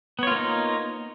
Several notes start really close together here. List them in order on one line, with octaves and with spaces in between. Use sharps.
B3 C#5 F4 A#3 D#4